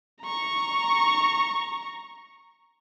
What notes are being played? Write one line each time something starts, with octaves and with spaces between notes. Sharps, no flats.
A#5 C#6